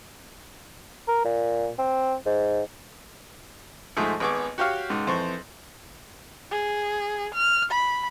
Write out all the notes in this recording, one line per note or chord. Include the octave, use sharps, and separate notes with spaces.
A#4
A#2
C4
G#2
G#2 F3 A3 G#4
G#1 B3 G#4 C#6 D6
F#4 G4 C#5 F5
C#2 G#2
F2 E3 C5 C#6
G#4
F6
B5